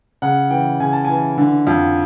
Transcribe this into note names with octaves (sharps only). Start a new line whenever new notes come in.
C#3 F#5
E3 G5
C#3 G#5
A5
E3 G#5
D3
F2